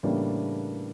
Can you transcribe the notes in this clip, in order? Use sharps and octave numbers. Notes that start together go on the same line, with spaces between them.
A2 C#3 E3 G3 A#3 D4